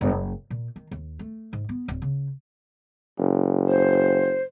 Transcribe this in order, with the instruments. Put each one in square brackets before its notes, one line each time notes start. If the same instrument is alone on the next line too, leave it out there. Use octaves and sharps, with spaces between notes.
[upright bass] F#1
A#2
D#3
D#2
A3
G#2
B3
D1
C#3
[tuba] F#1
[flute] C5